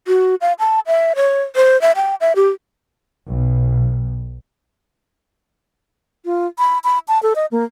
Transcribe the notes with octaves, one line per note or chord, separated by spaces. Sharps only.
F#4
F5
A5
E5
C#5
C5
E5
G5
E5
G4
B1
F4
B5
B5
A5
A4
D#5
A#3